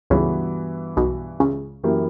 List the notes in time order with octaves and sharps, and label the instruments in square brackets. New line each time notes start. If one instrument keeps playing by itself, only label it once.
[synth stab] C#2 C#3 [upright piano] G2 E3 B3 F#4
[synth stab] B1 B2
C#2 C#3
[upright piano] F#2 E3 A#3 E4 G4